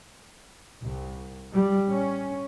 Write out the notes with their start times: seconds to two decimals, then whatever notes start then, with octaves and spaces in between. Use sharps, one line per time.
0.83 C2
1.53 G3
1.89 C#4